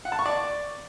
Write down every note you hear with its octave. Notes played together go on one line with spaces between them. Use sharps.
F#5
A5
C#6
D5